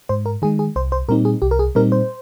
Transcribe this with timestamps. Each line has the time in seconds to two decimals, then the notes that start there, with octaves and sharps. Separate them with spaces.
0.09 G#2 C5
0.26 A#4
0.42 D#3 G#3 G#4
0.59 G#4
0.76 C2 C5
0.92 C5
1.09 A#2 G3 C4 D#4 A#4
1.25 G#4
1.42 C2 G4
1.51 A#4
1.59 G#4
1.75 A#2 G3 C4 D#4 A#4
1.92 C5